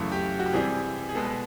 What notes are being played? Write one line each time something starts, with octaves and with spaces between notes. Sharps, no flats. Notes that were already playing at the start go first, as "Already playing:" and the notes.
Already playing: F#2 C#3 E3 A3
G4
F#4
G4
C3 E3 G3 G#4
G#4
B2 G#3 B3 A4
B4